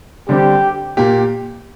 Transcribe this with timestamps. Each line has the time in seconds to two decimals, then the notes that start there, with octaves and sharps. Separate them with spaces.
0.29 D3 G3 C4 G4
0.97 A#2 A#3 G4